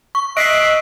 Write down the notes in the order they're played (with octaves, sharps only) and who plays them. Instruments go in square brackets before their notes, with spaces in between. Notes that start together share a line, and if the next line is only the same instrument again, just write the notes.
[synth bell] C#6
[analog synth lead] D#5 [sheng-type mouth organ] E5 F#6 [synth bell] B6 C7 D7